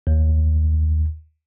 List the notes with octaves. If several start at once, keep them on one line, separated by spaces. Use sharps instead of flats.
D#2